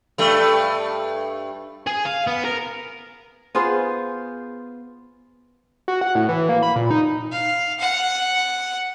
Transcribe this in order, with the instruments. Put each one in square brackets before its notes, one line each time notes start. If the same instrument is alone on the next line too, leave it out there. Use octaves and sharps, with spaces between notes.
[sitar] G2 A3
[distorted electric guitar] G#4
F5
B3
A#4
[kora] B3 F4 G#4 C5
[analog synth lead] F#4
F#5
A2
E3
A#3
B5
A#2
D#4
[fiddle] F5
F#5